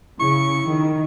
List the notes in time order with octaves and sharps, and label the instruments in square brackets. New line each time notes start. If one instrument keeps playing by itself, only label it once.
[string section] C#3 [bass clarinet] E4 [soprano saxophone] C#6
[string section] D#3